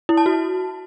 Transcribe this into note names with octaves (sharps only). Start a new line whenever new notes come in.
E4
A5
F#4